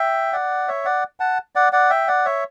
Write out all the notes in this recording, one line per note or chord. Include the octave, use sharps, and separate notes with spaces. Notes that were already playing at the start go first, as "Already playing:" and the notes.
Already playing: E5 G5
D5 F#5
C#5 E5
D5 F#5
F#5 A5
D5 F#5
D5 F#5
E5 G5
D5 F#5
C#5 E5